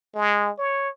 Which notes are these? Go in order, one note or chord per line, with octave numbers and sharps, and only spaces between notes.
G#3
C#5